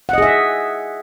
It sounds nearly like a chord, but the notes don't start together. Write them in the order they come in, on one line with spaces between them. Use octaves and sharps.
F#5 D#5 G#4 E5